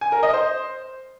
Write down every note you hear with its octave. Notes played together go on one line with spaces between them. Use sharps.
G#5
A#4
D#5
C5